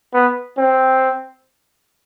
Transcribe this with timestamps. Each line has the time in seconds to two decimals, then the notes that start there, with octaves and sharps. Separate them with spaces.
0.14 B3
0.57 C4